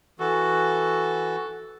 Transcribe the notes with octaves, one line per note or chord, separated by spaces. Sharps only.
E3 F#4 A4